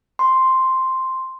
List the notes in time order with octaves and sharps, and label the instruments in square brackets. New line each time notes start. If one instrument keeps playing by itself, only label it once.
[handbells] C6